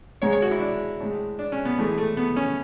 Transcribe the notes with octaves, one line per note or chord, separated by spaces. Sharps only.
G#2 G#3 C#5
C#5
F#4
E4
D4
A2 G#3
D4
C#4
B3
A2 E3 G#3 A3
A3
B3
C#4